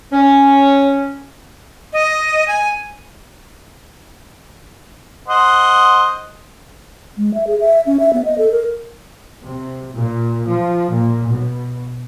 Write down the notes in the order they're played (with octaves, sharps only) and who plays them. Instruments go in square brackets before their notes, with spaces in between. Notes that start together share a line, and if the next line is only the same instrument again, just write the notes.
[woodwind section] C#4
[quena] D#5
G#5
[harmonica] C5 D#5 F#5
[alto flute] G#3
E5
G#4
E5
C#4
E5
B3
D#5
A4
A#4
[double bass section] C3
A#2
F3
A#2
B2